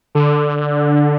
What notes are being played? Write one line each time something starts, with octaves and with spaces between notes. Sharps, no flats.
D3